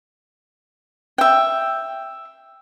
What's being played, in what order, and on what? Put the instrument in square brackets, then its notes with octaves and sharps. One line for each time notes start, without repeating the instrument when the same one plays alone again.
[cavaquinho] E5 G5